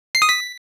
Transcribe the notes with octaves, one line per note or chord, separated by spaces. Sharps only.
C7
D#6
B6